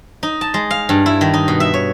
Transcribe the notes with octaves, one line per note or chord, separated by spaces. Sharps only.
D#4
A5
G#3
F5
G2
E4
D#3
D#4
B2
E5
C#5